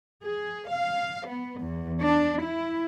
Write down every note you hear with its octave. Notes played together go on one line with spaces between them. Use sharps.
G#4
F5
B3
E2
D4
E4